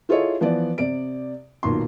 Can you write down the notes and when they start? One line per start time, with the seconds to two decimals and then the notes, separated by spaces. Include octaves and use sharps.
0.09 E4 F4 G#4 A4 C#5 D#5
0.41 E3 F3 B3 D5
0.78 C3 D5 D7
1.63 B1 A#2 D#3 C6